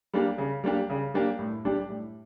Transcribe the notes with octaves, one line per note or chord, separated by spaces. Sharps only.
G3 A#3 D4 G4
C#3
G3 A#3 D4 G4
C#3
G3 A#3 D4 G4
A2
G3 D4 G4
A2